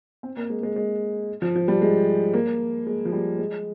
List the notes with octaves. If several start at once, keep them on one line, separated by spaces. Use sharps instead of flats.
C4
A#3
G#3
G#3
G#3
F3
F3
G3
G#3
A#3
G#3
F3
G3
G#3